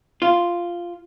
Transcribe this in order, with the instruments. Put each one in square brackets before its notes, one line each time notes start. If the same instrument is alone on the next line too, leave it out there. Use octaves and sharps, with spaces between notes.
[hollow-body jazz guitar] F4